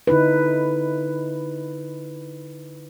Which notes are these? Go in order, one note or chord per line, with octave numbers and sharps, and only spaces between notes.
D3 D#4 E4 B4